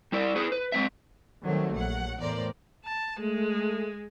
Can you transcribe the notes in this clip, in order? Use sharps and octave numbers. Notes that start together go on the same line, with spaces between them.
G3 E4 D5
E4 G#4 B4
B4
G#3 C4 E5
D#3 F#3 G3 A3 C4
A#1 F#3 F#5
E2 A2 A#4 C5 D5
A5
G#3 A3